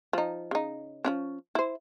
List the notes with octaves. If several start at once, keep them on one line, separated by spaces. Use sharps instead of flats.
F3 D#4
C#3 D#4
F3 C#4 D4
E4 C5